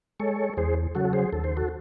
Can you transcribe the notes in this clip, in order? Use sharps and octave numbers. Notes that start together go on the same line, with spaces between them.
G#3 A4 C#5
E2 G#4 C5
C#3 F#3 F#4 A4
A4
G#4 C5
D#2 A4
C5
F#4 A4